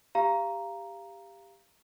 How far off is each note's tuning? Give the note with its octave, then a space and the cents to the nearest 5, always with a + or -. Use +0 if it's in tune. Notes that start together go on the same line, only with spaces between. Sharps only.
G4 +15 F5 -20 A#5 +0